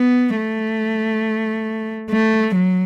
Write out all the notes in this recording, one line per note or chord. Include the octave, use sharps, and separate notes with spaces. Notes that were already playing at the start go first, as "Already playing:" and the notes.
Already playing: B3
A3
A3
F#3